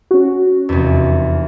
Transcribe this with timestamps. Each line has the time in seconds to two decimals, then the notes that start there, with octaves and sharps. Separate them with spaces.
0.11 C#4 F#4
0.69 F1 E2